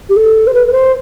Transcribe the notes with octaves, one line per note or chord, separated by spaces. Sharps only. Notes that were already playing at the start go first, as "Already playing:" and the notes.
G4
A4
C5
B4
B4
C5